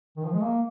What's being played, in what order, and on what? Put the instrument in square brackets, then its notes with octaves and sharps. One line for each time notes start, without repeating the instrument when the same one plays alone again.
[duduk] D#3
F3
G#3
A#3